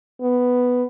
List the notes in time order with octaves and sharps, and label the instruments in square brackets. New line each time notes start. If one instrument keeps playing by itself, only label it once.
[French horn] B3